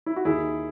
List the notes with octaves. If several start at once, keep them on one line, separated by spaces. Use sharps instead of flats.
E4
F#4
D#2 D#3 E4 G#4